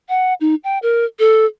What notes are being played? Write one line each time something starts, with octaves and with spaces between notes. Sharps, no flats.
F#5
D#4
G5
A#4
A4